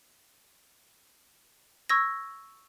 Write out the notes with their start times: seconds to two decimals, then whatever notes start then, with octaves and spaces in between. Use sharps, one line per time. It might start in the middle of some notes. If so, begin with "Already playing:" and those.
1.90 C#6 E6 G#6 A#6